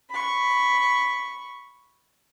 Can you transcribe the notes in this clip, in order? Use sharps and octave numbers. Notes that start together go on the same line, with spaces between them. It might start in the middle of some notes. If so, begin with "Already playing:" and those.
B5 C#6